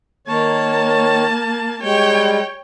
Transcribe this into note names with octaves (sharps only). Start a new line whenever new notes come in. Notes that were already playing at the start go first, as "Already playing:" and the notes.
D#3 A#3 C#5 A5
G3 G#3 C#5 G5